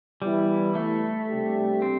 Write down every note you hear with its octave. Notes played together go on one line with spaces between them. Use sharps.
E3 G3 B3 E4
A3
C3 G3 D4 G4
C4